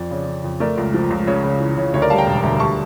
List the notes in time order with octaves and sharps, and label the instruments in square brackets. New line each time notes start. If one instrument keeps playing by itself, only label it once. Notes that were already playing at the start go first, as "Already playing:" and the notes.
Already playing: [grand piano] F2 D5
C#3
C#3
F2
A3 A#4 D5
C#2
F3
C#2
C#3 C#5
C#3
E3
C#3
D2 C#5
A#4 D5
G3 F5 A5
G5 A#5
E1
D2
G3 A5 C#6